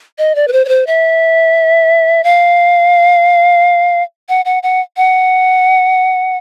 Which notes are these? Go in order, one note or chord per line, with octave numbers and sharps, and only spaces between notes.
D#5
D5
B4
C5
C#5
C5
E5
F5
F#5
F#5
F#5
F#5